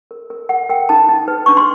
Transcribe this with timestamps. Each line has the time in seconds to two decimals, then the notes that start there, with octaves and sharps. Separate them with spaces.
0.11 A#4
0.30 A#4
0.49 A#4 F#5
0.69 A#4 G5
0.89 D#4 A5
1.09 D#4
1.28 B4
1.46 D4 C#6
1.57 C6